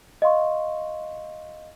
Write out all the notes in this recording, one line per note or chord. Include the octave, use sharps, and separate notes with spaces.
D#5 F5 C6 C#6